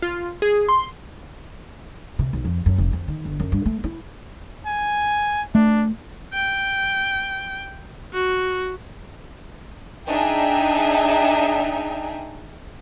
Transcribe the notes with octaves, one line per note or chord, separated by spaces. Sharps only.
F4
G#4
C6
C3
B1
F2
F#2
F1
F2
D#3
G1
F#2
G2
A3
E4
G#5
A3 D4
G5
F#4
D4 D#4 G#4 E5 G5 G#5